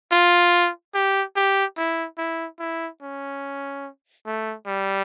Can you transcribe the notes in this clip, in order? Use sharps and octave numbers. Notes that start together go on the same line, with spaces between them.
F4
G4
G4
E4
E4
E4
C#4
A3
G3